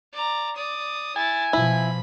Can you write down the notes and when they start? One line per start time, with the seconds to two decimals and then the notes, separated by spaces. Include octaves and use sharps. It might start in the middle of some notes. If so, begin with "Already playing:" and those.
0.13 D5 A#5
0.56 D5 D#6
1.16 E4 G#5 A6
1.53 B2 F3 E4 B5